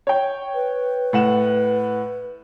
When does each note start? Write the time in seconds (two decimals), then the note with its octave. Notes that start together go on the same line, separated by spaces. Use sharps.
0.07 C#5 G5
0.54 B4
1.13 A2 F#5 E7